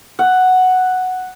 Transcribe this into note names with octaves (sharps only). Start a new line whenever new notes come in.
F#5